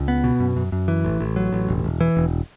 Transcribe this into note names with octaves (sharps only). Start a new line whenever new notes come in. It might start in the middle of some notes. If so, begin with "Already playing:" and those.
Already playing: C#2
B3
B2
F#2
F#2
F#2
E3
A1
A1
F#3
A1
E1
E1
E3
E1